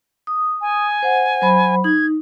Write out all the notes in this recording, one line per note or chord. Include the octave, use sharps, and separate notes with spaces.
D#6
G#5
C5 F#5
F#3 C5 B5
D#4 G#6